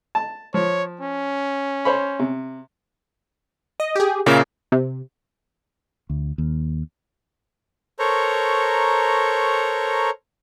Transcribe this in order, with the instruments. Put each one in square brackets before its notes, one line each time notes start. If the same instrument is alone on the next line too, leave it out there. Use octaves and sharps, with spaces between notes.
[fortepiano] A5
[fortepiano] F3 [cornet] C#5
[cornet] C#4
[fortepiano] C5 C#5 B5
C3
[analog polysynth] D#5
G4 G#4
[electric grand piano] A#2 C#3 A#3 [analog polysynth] E5 D6 C7
[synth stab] C3
[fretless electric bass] D2
D#2
[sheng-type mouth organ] A4 A#4 C5 C#5 A#5 C#6